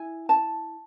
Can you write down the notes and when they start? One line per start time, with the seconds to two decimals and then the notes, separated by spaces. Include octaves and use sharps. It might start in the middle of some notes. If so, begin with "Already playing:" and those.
Already playing: E4 G#5
0.29 A5